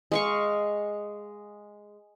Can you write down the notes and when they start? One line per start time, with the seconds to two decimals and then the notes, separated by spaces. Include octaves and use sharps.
0.12 G#3 F5 C#6